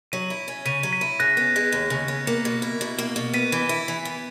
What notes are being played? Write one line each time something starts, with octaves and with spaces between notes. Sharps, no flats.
F#3 B6 D#7
E4
C#4
C#3 B6 D#7
F#3
B6 D#7
E4
C#3 F#6 A#6
B3
G#3
D#2
C#3
B3
A#3 A#6 C#7
B2
E4
B2
A#3
B2
B3 B6 D#7
E3
E4
E3
B3